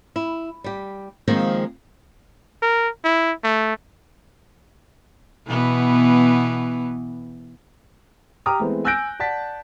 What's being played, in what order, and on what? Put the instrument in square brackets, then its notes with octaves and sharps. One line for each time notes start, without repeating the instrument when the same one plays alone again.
[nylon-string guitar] E4
G3 G4
D#3 F3 G#3 A#3 C4 D#4
[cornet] A#4
E4
A3
[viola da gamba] B2 E3 B3
[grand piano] G4 G5 A#5 D6 D#6 F6
E3 G#3 A3 B3 C4
G#5 E6 F#6 G6 A#6 D7
D5 F#5 A5 A6 B6